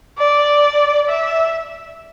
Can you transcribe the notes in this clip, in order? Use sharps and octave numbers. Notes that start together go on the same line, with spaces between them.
D5
E5